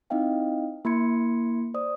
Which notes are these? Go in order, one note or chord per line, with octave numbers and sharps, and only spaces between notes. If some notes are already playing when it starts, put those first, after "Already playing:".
C4 D#4 E4 D#5 F5 G5
A#3 E4 B5 C6 G#6 C#7
C5 D5 D#6